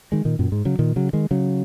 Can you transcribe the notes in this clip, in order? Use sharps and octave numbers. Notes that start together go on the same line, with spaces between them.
D#3 G#3
A#2 D#3
F#2 A#2
G#2
C#3 F#3
A#2 D#3
C#3 F#3
D#3 G#3
C#3 F#3